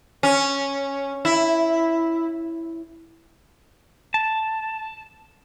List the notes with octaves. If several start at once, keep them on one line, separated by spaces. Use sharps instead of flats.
C#4
E4
A5